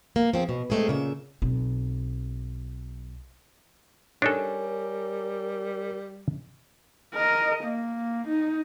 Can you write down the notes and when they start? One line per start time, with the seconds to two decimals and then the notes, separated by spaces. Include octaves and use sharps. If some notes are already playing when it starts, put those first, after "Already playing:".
0.16 A#3
0.34 F3 C4 G#4
0.49 B2
0.70 A2 G#3 A3 C4 G#4
0.88 A#2 C#3 E5
1.42 B1 C4
4.22 G3 D4 D#4 A4 A#4 C#5 G#5
7.15 A#4 D#5
7.64 A#3
8.28 D#4